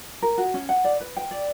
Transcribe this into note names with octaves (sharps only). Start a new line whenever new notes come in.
A#4
F#4
C#4
F#5
D5
B4
G5
D5